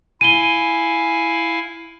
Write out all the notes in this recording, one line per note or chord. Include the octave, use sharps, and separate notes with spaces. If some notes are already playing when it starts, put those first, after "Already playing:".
E4 F5 G#5 D#7 G7